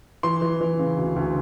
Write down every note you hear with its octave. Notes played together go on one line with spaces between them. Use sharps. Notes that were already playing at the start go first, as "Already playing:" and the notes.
E3 C6
E3
E3
C#3
D2
D2